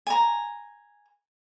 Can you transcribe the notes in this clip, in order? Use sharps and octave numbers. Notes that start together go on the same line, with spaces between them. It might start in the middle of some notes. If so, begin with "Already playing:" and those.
G#5 A#5